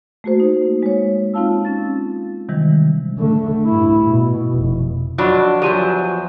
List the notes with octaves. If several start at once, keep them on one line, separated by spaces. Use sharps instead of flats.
A3 A#3 F#4 G#4 C5
D#4
G#3 C#5
C4 D#4 F4 F5 A5 E6
C#4 A6
C3 D#3 E3 G3 G#3
D3 A3
G2 E4
B2
F1
F2 F#3 D4 F4
E2 F3 F#3 G4 D#7